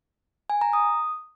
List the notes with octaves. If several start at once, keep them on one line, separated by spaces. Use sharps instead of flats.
G#5
A#5
D#6